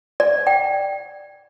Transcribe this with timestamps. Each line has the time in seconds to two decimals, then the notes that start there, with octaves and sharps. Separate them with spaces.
0.20 D5
0.47 G5